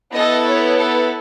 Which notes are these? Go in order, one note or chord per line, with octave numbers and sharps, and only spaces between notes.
B3 E4 A4 D#5
C#5
A4